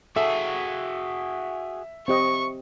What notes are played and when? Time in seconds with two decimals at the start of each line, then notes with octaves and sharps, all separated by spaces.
0.16 F#4 G#4 A4 E5
2.08 C4 G4 D#5 C#6